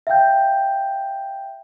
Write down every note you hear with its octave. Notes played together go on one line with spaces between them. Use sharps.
E5 F5 G5 G6